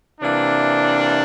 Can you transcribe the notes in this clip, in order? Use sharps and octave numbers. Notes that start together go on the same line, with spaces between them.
C3 E3 A#3 D4